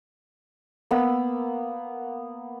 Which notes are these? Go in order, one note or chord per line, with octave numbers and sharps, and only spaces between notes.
A#3 B3 E6